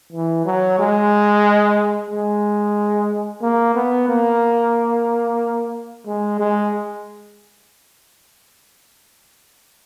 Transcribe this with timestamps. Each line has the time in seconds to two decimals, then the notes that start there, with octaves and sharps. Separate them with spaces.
0.12 E3
0.46 F#3
0.79 G#3
2.10 G#3
3.42 A#3
3.75 B3
4.08 A#3
6.07 G#3
6.40 G#3